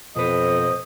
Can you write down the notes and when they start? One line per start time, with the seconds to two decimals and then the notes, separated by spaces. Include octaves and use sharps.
0.16 F2 B2 B4 C5 D#5